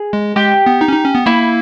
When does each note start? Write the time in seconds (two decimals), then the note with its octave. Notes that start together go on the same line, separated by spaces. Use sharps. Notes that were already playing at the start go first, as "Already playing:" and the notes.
Already playing: G#4
0.13 G#3
0.36 G#3 G4
0.66 B3
0.81 D#4
0.88 C#4
0.92 D#4
1.04 C#4
1.15 B3
1.26 A#3 E4